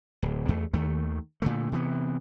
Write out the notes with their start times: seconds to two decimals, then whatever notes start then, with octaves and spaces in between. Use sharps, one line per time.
0.22 D1
0.48 E2 A3
0.73 D#2 D#3 A3
1.42 A#2 D3 A3
1.72 C3 E3 B3